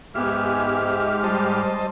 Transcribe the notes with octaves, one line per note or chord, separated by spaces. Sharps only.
G#2 G#3 B3 G4 E5 G#5 F6
G3 C5 D#5 A5